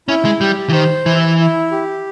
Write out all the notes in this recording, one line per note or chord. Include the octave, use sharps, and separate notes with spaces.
C#4 E4
G#3
G3 G4
E3
D#3 C5
E3 E4
E4
G4